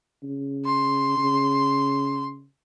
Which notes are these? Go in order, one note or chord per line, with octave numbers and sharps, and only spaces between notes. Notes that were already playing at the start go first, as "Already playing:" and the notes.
C#3
C6
C#3